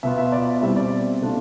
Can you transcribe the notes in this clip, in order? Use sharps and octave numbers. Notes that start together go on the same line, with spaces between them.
B2 B3 F4 E5
E5
D5
E5
B2 G3 C4 E4 E5
D5
B2 A3 D4 F4